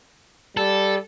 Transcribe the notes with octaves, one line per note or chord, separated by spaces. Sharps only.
G3 A4